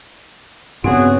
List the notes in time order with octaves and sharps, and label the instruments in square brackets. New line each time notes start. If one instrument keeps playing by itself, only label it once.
[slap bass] G2 C#3 [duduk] B3 [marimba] C4 [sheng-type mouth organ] F#4 G#4